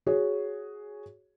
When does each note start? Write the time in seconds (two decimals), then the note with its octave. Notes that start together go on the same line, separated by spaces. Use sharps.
0.06 F#4 G#4 C#5